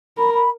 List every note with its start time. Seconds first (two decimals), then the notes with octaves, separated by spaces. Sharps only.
0.17 A#4 B5
0.34 B5